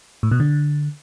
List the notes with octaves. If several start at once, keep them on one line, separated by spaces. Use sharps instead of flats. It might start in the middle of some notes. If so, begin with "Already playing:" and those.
A2
B2
D3